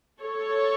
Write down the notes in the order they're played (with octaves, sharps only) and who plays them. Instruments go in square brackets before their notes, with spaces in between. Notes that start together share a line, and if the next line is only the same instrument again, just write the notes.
[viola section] A4 C#5